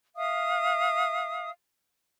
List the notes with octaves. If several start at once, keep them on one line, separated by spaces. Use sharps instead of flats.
E5 F5 D#6